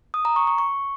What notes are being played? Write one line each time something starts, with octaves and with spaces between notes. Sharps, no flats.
D#6
A#5
C#6
C#6
C#6